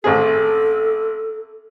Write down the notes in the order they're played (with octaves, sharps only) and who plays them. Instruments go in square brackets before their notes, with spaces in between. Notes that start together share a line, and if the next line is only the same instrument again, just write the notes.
[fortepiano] A1 C4 G#4 [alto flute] A4